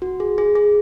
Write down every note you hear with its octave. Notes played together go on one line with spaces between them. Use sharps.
F#4
G#4
G#4
G#4